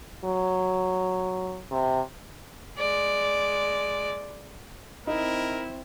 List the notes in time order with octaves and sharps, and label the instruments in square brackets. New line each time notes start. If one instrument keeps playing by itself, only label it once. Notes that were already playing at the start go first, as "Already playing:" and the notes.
[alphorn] F#3
C3
[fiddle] G#3 D5
[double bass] C4 [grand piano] D#4 [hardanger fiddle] E4 [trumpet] A#4